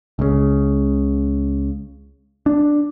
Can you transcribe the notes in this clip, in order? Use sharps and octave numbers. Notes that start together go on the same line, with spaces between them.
C#2 C#3
D4